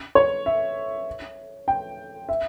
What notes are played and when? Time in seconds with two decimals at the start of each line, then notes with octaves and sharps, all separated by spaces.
0.15 C#5
0.46 E5
1.68 G5
2.29 E5